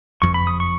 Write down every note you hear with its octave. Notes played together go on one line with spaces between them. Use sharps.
F#1 F2 F3 C#6
B5
D#6
C#6